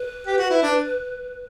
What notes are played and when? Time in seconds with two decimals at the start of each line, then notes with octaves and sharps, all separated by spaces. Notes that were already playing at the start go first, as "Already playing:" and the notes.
Already playing: B4
0.27 G4
0.38 F#4
0.50 E4
0.62 D4